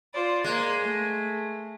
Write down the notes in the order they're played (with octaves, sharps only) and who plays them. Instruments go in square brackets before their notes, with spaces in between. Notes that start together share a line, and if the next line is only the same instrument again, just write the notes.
[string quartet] F4 C5 D5
[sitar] G#3 [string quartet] A#3 C6
[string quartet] A3